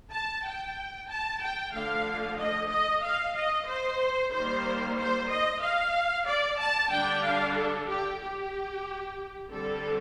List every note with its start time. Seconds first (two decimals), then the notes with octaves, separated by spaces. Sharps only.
0.12 A5
0.44 G5
1.09 A5
1.41 G5
1.73 D3 F3 A3 D4 F5
2.38 D#5
2.70 D#5
3.03 F5
3.35 D#5
3.67 C5
4.32 D#3 G3 A#3 C5
4.97 C5
5.30 D#5
5.61 F5
6.26 D5
6.59 A5
6.91 D3 G3 D4 G5
7.23 F5
7.56 A4
7.88 G4
8.20 G4
9.49 D3 G3 C4 A4